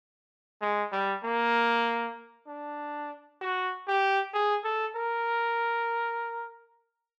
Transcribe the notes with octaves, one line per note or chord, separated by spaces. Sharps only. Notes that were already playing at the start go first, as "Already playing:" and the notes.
G#3
G3
A#3
D4
F#4
G4
G#4
A4
A#4